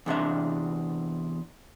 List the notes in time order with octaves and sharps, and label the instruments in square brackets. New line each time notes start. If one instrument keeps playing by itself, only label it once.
[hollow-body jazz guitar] E2 C3 D4 E5